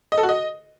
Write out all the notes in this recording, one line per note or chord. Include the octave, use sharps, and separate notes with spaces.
D#5
A4
F#4
D#5